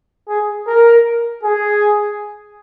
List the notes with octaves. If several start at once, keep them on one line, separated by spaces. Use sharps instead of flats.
G#4
A#4
G#4